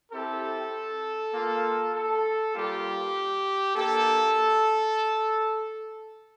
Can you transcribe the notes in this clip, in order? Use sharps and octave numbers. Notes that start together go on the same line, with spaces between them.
C4 E4 G4 A4
A#3 F4
A4
G3 A#3 F4 G4
A#3 D4 G4 A4